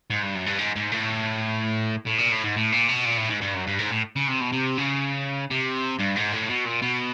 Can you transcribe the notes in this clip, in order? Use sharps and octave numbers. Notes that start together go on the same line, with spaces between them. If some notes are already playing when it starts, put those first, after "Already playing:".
G#2
G2
F#2
G2
G#2
G#2
A2
A2
A#2
A2
G#2
A2
A#2
B2
A#2
A2
G#2
G2
F#2
G2
G#2
A2
C#3
C3
B2
C3
C#3
C3
G2
G#2
A2
B2
A#2
B2